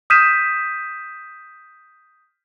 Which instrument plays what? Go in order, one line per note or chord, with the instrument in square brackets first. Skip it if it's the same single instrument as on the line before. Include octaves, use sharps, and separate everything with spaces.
[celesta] D#6 F6 G6 B6 D#7 E7